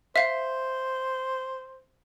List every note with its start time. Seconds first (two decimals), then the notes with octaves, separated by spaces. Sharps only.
0.16 C5 E5 F5